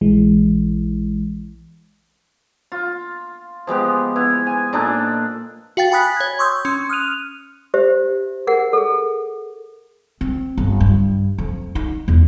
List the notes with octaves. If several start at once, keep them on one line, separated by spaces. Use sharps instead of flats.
A#1 E3 G#3
F4
F3 G#3 B3 G4
B3 E4
G#5
A#2 D4 D#4 A4
F#4 F5 G5 A6
G5 G#5 B5 D#6 F#6 B6
C#5 G#6
C6 C#6 D#6 E6 G6
C#4 C6
D#6 F6 F#6 D#7 F7
G4 C5 E5
G#4 A#4 F#5
G#4 A4
C4
G1
G2
F2
D#4
E2